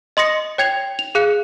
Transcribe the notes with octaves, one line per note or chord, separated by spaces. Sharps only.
D#5 C6 D#6 A#6 C#7
C#5 G5 G#6 C7 F7
F7
G#4 F5 F#6 C#7